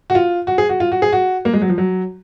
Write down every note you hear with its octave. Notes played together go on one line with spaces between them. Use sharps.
F#4
F4
F#4
G#4
F#4
F4
F#4
G#4
F#4
A#3
G#3
F#3
F3
F#3